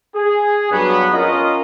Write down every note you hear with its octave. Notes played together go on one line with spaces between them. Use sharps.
G#4
G2 F#3 B3
C#4 F4 A#4 D#5